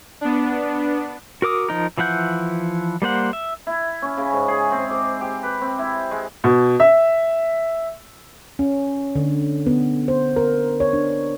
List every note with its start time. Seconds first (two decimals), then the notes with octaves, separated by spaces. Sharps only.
0.21 B3 D4
1.42 F#4 A#4 D6 D#6
1.69 F3 D#4 A#4
1.97 E3 F3 E4 F#5 G6
3.02 G3 A#3 C5 F#5
3.33 E5
3.67 E4
4.02 C#4
4.17 C#3
4.33 G#2
4.48 G#4
4.71 C4
4.90 D6
5.21 G4
5.43 B4
5.62 C4
5.79 E4
6.11 G#3
6.44 B2
6.80 E5
8.59 C#4
9.15 D3
9.66 B3
10.08 C5
10.36 A#4
10.80 C#5
10.93 D4